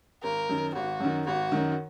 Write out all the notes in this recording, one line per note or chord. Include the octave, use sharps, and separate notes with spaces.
G#1 A#4
F#2 D#3
G#1 F#4
F#2 D#3
G#1 F#4
F#2 D#3